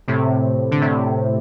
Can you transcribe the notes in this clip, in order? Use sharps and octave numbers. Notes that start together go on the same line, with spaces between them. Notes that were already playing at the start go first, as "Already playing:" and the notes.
A2 C3
D3
A2 C3